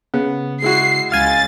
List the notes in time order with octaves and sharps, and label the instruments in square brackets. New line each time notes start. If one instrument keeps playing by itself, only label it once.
[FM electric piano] C#3 [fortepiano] B3
[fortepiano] G#3 E4 F#4 [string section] C7
[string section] C#2 A6 [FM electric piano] F5 G#5